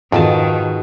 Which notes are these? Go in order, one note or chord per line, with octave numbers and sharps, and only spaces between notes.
F2 G#2 B2 D#3 F3 A5